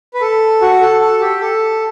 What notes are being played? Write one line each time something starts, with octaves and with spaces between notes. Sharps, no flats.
B4
A4
F#4
A4
A4
G4
A4